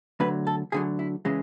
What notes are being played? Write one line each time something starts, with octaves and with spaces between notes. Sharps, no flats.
D2 D3 F#3 B4
A4
D2 D3 F#3 G#4
E4
C#3 E3 G#3